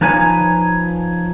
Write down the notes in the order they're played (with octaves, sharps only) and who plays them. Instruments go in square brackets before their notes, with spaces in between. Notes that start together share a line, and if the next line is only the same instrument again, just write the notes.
[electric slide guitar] F3 D#4 B4 C#5 G#5